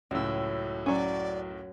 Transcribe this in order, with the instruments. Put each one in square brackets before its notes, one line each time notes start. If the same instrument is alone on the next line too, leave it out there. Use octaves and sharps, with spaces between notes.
[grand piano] C#2 A2 [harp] F#2 E6
[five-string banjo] F#3 C#4 [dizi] D5